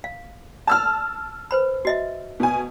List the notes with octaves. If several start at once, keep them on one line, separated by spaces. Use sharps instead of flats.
F5
A5 E6 F6
B4 C5 B5
F#4 D#5 E5
B2 G#5